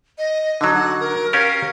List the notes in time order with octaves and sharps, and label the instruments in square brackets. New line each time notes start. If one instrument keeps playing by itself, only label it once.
[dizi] D#5
[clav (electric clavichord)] D3 F#3 [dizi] D#4
[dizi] F#5
A#4
[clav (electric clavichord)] C#4 G4 A#4 [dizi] F5